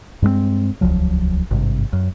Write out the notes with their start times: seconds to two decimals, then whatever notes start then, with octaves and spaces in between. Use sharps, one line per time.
0.22 G2 G#3 A3 C4
0.81 D#1 C#2 F3 F#3
1.51 G#1 G2 C3
1.93 F#2